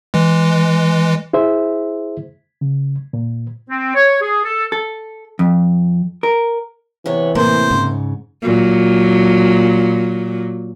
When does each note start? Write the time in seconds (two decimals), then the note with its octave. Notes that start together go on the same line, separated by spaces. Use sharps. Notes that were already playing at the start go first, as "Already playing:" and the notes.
0.14 E3 G#3
1.33 E4 G#4 C5 E5
2.61 C#3
3.13 A#2
3.70 C4
3.95 C#5
4.22 G#4
4.45 A4
4.72 A4
5.39 F2
6.23 A#4
7.06 C3 E3 B3 C#5
7.35 A2 C3 A#3 C5
7.71 G#2 C#3
8.42 A#2 F#3